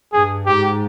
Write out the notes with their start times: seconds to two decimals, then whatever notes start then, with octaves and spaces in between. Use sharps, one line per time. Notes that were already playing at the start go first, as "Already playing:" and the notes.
0.13 G2 G#4
0.46 G#2 G4